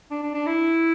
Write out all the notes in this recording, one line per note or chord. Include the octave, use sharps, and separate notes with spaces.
D4
D4
D4
E4